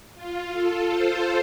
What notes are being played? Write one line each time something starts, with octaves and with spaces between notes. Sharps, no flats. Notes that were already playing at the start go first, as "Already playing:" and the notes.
F4
A4
C5